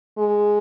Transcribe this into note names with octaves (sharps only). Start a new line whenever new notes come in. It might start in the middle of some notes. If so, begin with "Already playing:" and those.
G#3